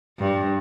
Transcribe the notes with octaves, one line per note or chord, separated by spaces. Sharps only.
G2